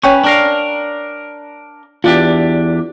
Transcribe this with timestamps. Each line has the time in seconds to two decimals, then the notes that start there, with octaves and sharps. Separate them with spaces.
0.04 C#4 B4 C#5 G5 C#6
0.24 D4 A#4 F5
2.04 E2 D4 F4 G4